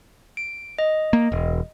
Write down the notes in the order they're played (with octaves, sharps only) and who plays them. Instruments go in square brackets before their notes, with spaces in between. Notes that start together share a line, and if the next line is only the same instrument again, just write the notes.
[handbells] D7
D#5
[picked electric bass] A#3
E1